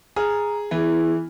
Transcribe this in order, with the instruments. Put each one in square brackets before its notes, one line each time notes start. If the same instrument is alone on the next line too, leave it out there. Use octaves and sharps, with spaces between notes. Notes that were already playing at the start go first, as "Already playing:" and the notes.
[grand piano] G#4 F6 [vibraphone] A#5
[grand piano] E3 [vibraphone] B3 E4 G#4